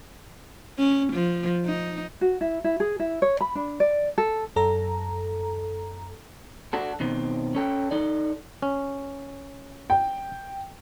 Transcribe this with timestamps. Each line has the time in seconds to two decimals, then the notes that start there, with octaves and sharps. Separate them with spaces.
0.79 C#4
1.13 F3
1.65 D#4
2.21 F#4
2.41 E4
2.64 E4
2.80 G#4
2.99 E4
3.22 C#5
3.41 B5
3.55 D4
3.80 D5
4.18 A4
4.56 F#2 A4 A#5
6.73 D4 F#4 A4
7.00 B2 D#3 C4
7.55 C#4 A4 G5
7.91 D#4 A4 D5
8.62 C#4
9.90 G5